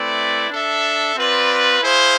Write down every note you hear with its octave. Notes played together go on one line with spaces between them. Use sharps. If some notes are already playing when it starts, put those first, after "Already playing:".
Already playing: A3 C4 E4 B4 D5
D4 A4 E5
C4 F4 B4 D5
E4 G#4 C5 F5